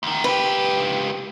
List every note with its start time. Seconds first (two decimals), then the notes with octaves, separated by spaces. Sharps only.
0.03 D2 D#3
0.24 C#2 G4 B4